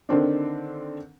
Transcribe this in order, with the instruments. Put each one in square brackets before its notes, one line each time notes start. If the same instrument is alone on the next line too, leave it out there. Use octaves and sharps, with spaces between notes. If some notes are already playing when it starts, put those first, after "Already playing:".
[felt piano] D3 D#3 C4 D4